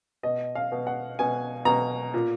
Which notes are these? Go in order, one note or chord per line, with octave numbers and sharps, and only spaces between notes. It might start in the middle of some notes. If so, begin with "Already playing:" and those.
B2 D#5
F5
B2
F#5
B2 G#5
B2 A#5
A#2